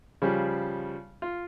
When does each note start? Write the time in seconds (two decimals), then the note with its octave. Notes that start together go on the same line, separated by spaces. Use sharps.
0.22 C#3 F3 G3
1.22 F4